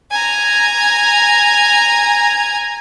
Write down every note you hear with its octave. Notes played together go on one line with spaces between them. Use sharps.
G#5 A#5